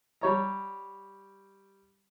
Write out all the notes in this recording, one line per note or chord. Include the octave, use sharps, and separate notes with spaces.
G3 C#5 A#5